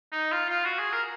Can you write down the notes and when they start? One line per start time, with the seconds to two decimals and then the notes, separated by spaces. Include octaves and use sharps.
0.12 D#4
0.32 F4
0.49 F4
0.65 F#4
0.79 G#4
0.92 A#4